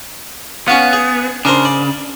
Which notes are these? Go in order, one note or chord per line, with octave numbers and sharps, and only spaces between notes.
B3 C#4 F#4 F5
G#4
C#3 D4 A#4 C5
D5